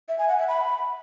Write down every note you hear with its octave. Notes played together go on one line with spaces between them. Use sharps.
E5
G#5
F#5
E5
B5